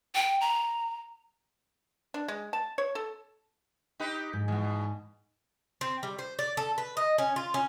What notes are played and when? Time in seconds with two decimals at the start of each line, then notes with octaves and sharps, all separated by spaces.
0.15 G5
0.41 A#5
2.14 D4
2.28 G#3
2.53 A5
2.78 C#5
2.95 A4
4.00 D#4 G4 B4
4.33 G#2 G#3
4.48 E2 B2 G#3
5.81 C4
6.03 G3
6.19 C5
6.39 D5
6.57 A4
6.78 B4
6.97 D#5
7.18 C#4
7.36 F4
7.54 C#4